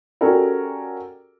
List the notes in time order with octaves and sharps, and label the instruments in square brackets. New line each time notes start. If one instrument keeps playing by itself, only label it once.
[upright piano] C#4 F#4 G4 A4 A#4 D5